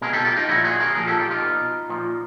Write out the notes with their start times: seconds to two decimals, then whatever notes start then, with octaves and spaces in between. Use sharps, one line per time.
0.02 B2 G#4 A#4
0.13 G4 A4
0.25 F4 G4
0.36 D#4 F4
0.48 A#2 F3 E4 F#4
0.64 F#4 G#4
0.80 G#4 A#4
0.95 A#2 F3 G#4 A#4
1.07 G4 A4
1.19 F4 G4
1.31 D#4 F4
1.42 B2
1.89 A#2 F3